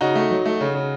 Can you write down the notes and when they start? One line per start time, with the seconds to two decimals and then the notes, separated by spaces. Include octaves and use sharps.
0.01 C#3 D#4 F#4
0.15 A3
0.31 F#3
0.45 A3
0.61 C#3
0.75 C#3